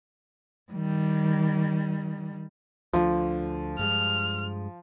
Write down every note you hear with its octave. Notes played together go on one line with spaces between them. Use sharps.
D#3 G3
D2 D3 F3
G2 G#3 F6